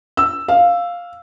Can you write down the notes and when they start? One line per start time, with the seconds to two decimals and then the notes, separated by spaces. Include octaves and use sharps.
0.17 E6
0.48 F5